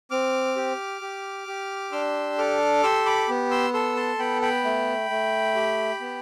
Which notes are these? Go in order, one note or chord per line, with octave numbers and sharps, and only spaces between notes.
C4 D6 F6
G4
G4
G4
D4 C6 E6
A4 D6 F6
G4 C6 E6
B5 D6
B3
C6 E6
A4 C6 E6
A5 C6
B3 G5 B5
G5 B5
A3
A3
G4
B3